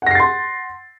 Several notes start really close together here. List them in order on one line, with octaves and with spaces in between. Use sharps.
F#5 A#6 C7 A6 C6